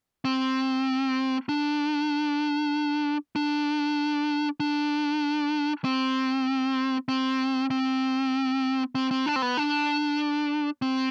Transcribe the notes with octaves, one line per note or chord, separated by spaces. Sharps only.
C4
D4
D4
D4
C4
C4
C4
C4
C4
D4
C4
B3
D4
C4